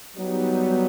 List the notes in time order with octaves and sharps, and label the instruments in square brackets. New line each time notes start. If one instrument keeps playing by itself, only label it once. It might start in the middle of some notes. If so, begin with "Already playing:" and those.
[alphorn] F#3 [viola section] G3 B3 D#4